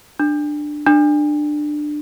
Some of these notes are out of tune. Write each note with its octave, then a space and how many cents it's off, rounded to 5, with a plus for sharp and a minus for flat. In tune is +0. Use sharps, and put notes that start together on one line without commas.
D4 +15
D4 +20